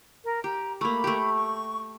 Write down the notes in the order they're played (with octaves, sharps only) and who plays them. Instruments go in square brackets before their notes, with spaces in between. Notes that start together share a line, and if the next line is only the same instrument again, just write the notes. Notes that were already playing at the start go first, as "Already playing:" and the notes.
[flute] A#4
[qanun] G4 [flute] A#5
[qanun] A3 A#3 [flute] B5
[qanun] A3 G4
[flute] C#6